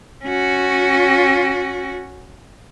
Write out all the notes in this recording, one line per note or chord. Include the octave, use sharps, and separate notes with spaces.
C#4 F#4